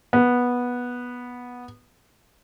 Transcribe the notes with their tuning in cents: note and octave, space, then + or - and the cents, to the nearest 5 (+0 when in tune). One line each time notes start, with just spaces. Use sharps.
B3 -10